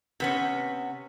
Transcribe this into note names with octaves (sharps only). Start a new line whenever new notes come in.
C3 B3 C#4